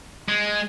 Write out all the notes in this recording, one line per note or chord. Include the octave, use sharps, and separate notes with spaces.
G#3